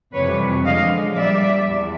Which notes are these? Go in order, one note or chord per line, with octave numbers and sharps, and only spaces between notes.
F2 C3 E3 G3 B4 C#5
F#2 D3 F3 G#3 D#5 F5
A#2 G3 D5 E5
E2